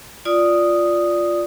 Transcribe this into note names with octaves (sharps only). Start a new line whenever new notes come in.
F4 D5 D#6